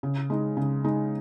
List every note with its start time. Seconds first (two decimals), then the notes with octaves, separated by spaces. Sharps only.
0.03 C#3
0.30 G#3 D#4
0.57 C#3
0.84 G#3 D#4